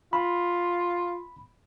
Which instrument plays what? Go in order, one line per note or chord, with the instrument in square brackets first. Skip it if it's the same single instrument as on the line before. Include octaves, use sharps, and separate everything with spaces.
[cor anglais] F4 [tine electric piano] B5